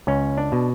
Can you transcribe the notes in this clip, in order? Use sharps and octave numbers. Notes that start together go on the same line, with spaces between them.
C#2 C#4
D4
B2